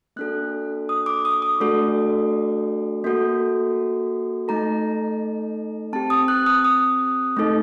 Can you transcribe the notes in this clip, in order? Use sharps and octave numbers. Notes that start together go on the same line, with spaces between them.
A#3 D4 F#4 A4 F#6
D#6
D6
D#6
D#6
A3 D4 F#4 A4
A#3 F#4 A4
A3 D#4 A4 A#5
C4 G4 A5
D#6
F#6
D#6
D#6
A3 D#4 A4